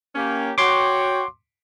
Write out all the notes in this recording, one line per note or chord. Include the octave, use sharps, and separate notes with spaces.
A#3 C#4 G4
F#4 C#5 G5 C6 D6